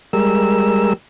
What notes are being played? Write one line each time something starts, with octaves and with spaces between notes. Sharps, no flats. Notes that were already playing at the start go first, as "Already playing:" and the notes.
G3 G#3 A#4 E6